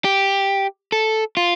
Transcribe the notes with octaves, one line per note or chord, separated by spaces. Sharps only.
G4
A4
F4